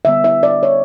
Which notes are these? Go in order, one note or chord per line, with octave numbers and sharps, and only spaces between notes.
D3 G3 B3 E5
E5
D5
C#5